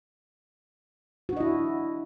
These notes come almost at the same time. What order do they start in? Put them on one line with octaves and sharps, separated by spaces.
F#4 D4 D#5 E4